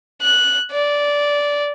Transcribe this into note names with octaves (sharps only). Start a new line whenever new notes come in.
F#6
D5